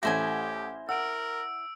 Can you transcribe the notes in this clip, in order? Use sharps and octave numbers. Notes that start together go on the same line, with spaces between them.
A1 A3 E4 G4 C5 G#5 A#6
A#4 F#5 E6 D7